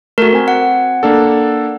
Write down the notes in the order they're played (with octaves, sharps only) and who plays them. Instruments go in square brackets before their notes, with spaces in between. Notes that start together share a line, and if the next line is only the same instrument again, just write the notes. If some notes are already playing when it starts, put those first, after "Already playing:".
[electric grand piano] A3 [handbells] F#4 A#4
[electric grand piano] C4 G#5
[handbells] F#5
[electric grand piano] A#3 D4 A4